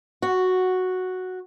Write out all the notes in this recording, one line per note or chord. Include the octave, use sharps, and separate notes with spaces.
F#4